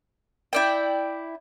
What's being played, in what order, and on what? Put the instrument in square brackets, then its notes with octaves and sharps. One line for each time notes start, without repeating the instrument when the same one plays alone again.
[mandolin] E4 D5 G5